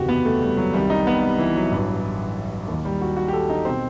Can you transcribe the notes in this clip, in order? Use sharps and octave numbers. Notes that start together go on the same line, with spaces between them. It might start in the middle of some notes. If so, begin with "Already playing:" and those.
Already playing: F#1 E2 C3 D#3 F#4 G4
B3
A3
G3
F#3
C2 C3 D#3 G3
D#4
B3
G3
E3
F#3
A1 G2 E3
D#2 D#3
G3
F#4
F#4
G4
A4
D#4
B2 C4